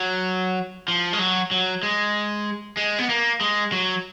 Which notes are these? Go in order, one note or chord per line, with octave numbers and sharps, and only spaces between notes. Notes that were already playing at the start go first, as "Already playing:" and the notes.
Already playing: F#3
F3
G#3
F#3
F#3
G#3
G#3
B3
A#3
G#3
F#3